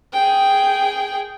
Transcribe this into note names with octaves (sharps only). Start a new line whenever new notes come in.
G#4 G5